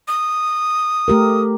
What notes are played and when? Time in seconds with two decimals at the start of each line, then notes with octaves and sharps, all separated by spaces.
0.08 D#6
1.08 A3 G4 A#4